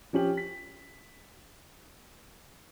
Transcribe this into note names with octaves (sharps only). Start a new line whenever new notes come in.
F3 C#4 G4 F#7
B6